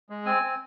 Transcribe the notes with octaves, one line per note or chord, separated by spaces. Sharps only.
G#3
C4 G#5
C4